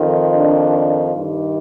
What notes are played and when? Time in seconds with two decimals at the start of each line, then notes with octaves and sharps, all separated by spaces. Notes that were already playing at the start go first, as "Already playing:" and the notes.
Already playing: F2 D#3
0.35 D4
1.16 G2 D#3